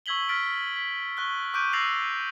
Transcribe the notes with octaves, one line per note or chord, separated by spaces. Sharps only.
C#6 E6 G#6 B6 F#7 G7
F6 A6 B6 D7
B6
C#6 F#6 G7
C#6 D6 F#6 G6 D7 D#7
E6 A6 A#6 C7 F7 F#7